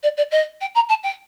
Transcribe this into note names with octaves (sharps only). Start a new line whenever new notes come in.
D5
D5
D#5
G5
A#5
A5
G5